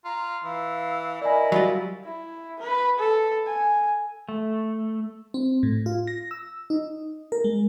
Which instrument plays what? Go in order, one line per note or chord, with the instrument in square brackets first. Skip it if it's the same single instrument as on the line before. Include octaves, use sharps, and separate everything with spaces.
[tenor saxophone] F4 [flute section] A#5
[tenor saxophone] E3 [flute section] F5 E6
[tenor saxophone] E4 [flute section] A#4 D#5 B5 [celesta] D5 G#5
[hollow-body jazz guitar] F#3 G3 F4 [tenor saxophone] E4
[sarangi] E4
B4
A4
G#5
[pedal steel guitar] A3
[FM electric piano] C4
A2
F4
A#6
E6
D#4
A#4
G#3